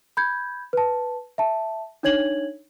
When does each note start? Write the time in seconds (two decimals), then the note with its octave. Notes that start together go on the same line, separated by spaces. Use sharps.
0.17 B5 G6 G#6
0.73 B4 A5
1.38 E5 A5
2.03 D4 D#4 C#5 G#6 F#7